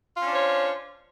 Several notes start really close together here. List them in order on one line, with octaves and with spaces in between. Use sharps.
F4 C#4 D4 C5 C#5